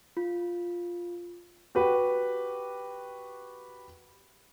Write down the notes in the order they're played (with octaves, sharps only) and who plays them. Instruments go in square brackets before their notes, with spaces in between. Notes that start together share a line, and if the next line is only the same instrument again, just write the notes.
[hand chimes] F4
[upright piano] F#4 G4 B4